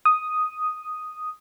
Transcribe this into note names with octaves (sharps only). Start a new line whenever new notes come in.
D#6